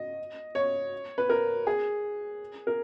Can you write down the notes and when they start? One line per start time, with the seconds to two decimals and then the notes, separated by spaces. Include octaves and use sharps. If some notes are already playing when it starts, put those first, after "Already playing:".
Already playing: D#5
0.55 C#5
1.18 B4
1.30 A#4
1.67 G#4
2.67 A#4